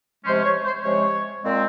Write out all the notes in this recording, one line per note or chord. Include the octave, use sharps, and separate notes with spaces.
C3 F3 G#3 C#4 C5
C#5
C5
C3 F3 G#3 C#4 C#5
A#2 G#3 C4